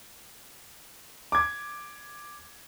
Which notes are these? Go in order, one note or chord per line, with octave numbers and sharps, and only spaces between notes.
D6 G#6